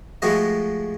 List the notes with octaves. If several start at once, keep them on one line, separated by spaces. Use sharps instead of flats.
F3 G#3 A3 F#4 G4 D#5